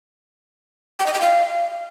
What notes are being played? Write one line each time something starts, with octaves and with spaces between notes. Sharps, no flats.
G5
D#5
G5
F5